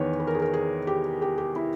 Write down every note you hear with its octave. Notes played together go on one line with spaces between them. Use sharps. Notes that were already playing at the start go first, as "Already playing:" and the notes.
Already playing: E2 D#3 B3 B4 C#5
B4
A#4
G#4
A#4
G#4
G4
G4
G4
E4